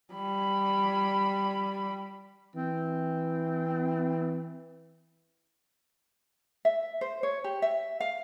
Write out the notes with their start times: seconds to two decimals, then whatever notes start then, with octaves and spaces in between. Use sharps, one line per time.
0.14 G3 B5
2.56 E3 C4
6.65 E5
7.01 C5
7.23 C#5
7.44 G4
7.62 E5
8.00 F5